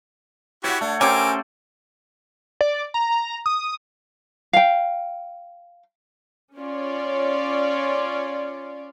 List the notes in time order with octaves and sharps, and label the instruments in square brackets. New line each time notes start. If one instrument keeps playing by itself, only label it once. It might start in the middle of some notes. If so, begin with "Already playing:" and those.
[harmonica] E4 F#4 G4 [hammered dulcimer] C#5 F#5
[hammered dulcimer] A3 [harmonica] D4
[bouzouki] C#4 C5 [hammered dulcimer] G4 D5 [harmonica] A#4 D6 [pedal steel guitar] G#5 E6
[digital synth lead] D5
A#5
D#6
[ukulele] F5 G5
[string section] C#4 F4 C#5 D5